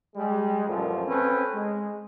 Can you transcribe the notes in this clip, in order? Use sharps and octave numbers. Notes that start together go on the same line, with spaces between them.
G3 G#3
A1 F#2 A#2 F3 A4
C4 C#4 A4 B4
G#3